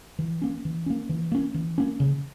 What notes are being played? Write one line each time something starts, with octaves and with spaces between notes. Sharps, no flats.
E3
A#3 C#4
E3
A#3 C#4
E3
A#3 C#4
E3
A#3 C#4
C#3